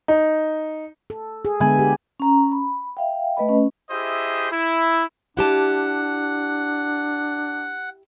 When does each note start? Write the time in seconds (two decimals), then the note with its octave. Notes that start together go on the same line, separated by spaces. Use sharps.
0.08 D#4
1.10 A4
1.45 G#4
1.60 D3 G#3 B3 G#5 B5
1.79 G4
2.20 C#4 A#5
2.52 B5
2.97 E5 F5 G5
3.37 A3 B4 D#5 B5
3.49 C#4
3.90 E4 G4 G#4 C5 D#5 E5
4.51 E4
5.37 D4 E4 G4 F#5 A5